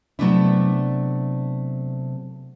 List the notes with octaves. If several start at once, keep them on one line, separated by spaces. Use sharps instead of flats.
C3 F#3 A3 B3 D4 E4